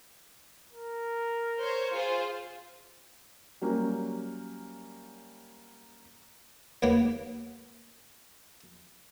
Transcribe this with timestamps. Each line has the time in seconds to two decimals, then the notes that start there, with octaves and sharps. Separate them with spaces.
0.72 A#4
1.59 C5 C#5
1.92 F4 G#4 C5
3.61 F#3 G3 A#3 C#4
6.82 D#2 C#3 A#3 B3